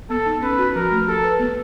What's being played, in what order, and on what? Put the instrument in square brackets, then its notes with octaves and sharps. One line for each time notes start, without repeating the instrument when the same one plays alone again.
[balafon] B3 [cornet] A4
[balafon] D#4
[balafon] C#4 [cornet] B4
[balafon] F#4
[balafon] F3 [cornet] A#4
[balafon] A3
[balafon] G4 [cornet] A4
[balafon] B4
B3